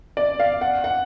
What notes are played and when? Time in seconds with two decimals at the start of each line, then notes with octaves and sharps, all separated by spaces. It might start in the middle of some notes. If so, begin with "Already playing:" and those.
0.17 D5
0.40 F5
0.61 F#5
0.84 F#5